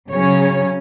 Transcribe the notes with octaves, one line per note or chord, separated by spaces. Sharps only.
C#3 F#3 C#4 C#5